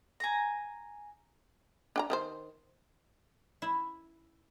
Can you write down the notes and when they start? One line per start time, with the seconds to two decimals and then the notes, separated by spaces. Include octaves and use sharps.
0.20 G#5 A#5
1.96 D4 G5 A#5
2.10 D#3 D#4 C5
3.62 E4